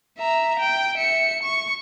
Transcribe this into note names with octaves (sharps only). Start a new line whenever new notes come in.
E5 A#5
G5
E5 C#7
C#6